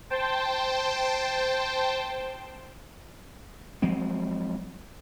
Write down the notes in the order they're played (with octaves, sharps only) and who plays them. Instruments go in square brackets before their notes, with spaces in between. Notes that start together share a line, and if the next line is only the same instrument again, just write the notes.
[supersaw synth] C5 G5 A5
[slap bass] F3 F#3 G#3 C4